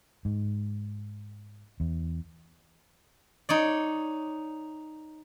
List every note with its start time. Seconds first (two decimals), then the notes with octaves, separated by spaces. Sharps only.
0.25 G#2
1.80 E2
3.49 D#4 C#5 D5